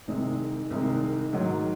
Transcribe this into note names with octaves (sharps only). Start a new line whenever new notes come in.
C2 C3 D#3 G#3
C2 C3 D#3 G#3
G#2 D#3 F#3